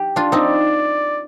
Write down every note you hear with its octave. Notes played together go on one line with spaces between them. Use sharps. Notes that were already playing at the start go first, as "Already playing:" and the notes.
Already playing: G4
D4 F4
C4 D#4 D5